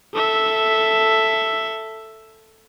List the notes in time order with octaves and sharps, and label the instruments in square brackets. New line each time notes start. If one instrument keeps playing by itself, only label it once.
[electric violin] A4 E5